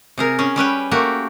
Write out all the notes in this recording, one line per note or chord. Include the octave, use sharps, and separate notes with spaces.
C3 G#4 A#4
C#4 G#4
G3 C#4 B4 G5
A3 A#3 F#4 G4